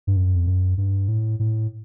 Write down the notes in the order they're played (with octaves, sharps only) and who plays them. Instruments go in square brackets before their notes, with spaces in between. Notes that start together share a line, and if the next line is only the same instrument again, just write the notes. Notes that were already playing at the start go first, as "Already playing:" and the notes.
[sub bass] G2
F#2
F2
F#2
G2
A2
A2